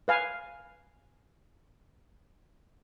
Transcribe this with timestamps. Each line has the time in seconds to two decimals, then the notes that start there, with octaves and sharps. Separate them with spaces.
0.08 B4 F5 G#5